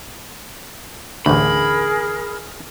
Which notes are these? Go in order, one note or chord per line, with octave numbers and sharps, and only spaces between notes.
A1 D2 G#4 A#4 B5